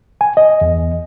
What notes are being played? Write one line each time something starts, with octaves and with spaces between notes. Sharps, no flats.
G#5
D#5
E2